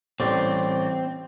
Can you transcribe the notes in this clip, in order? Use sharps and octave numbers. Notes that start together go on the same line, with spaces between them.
A1 A2 G3 C4